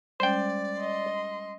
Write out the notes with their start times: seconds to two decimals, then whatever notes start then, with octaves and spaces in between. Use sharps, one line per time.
0.20 G3 G#3 C#4 C5 D5 G5
0.79 D#5 C6